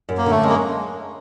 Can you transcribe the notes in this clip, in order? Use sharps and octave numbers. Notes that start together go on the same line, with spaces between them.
F#2
A#3
D3 A3
F#2 G#3
A#3